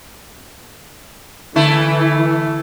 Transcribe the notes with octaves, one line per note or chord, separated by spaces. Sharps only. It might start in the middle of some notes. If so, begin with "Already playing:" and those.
D3 E3 A3 E4